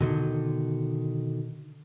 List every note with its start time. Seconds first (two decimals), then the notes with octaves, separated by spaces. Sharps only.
0.01 B2 D3 D#3